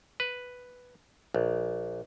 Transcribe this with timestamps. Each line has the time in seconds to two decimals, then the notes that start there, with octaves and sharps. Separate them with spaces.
0.20 B4
1.35 A#1